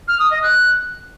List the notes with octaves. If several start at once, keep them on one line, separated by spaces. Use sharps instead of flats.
F6
D#6
D#5
F#6